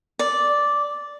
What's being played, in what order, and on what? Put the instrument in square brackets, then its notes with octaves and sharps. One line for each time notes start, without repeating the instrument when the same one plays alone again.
[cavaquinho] D5